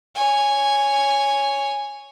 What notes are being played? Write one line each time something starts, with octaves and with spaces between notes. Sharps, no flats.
C#5 G#5